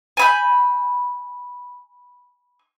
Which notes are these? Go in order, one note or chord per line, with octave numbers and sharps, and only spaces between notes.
G#5 B5 G6